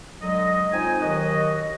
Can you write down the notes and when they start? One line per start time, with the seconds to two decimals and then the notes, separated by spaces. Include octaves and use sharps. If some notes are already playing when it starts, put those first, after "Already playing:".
0.21 D3 F#3 G#3 D#5
0.72 C4 D#4 F4 G#5
1.01 D#2 D#3 F#3 F#4 D#5